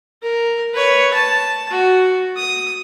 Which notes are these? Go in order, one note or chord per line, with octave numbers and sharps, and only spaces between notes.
A#4
B4 C#5
A5
F#4
D#6